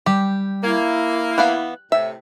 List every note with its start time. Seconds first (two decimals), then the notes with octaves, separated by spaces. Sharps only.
0.06 G3 G4
0.64 A#3 E4 G#6
1.38 E3 B3 F5 F#6
1.92 A2 C3 E5